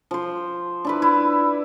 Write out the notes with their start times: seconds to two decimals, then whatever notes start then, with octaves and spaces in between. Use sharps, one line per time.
0.11 F3 C5
0.85 D4 E4 B4
1.02 E4